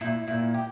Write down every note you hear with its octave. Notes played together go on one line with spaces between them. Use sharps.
A#2 E4
A#2 E4
G4